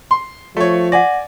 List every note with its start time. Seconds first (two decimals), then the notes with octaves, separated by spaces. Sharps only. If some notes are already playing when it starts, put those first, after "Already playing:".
0.11 C6
0.57 F3 A3 C#5
0.92 D5 F#5 G#5 A#6